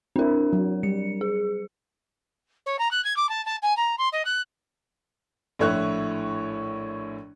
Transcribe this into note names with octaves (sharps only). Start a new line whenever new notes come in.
C4 D4 E4 A#4
F#3
G3 C#7
G#4
C#5
A#5
F#6
G#6
D6
A5
A5
G#5
A#5
C6
D#5
F#6
A#1 A2 E4 C#5 C#6 F#6